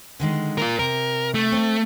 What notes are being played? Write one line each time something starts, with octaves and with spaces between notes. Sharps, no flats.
D3 D#3 G#3
F4 A#4
C3 A#4
A3
C4